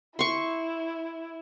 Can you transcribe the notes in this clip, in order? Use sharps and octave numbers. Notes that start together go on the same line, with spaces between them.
E4 C6 C#6